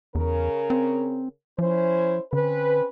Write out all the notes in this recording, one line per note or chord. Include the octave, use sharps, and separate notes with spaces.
E2 C#3 A#4
C4
F3 C#4 E4 C5
D3 C4 C#4 B4